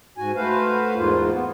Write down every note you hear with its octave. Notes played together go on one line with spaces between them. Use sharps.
G#2 F#4 G#5
A3 F#4 B4 C5 F5
E2 G#2 A#3 F4
B3